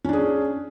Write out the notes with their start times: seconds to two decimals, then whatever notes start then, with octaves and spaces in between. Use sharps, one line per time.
0.05 C#4
0.09 D4
0.13 G#4